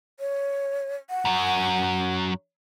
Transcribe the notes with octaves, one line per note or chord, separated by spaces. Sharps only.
C#5
F#5
F#2 F#3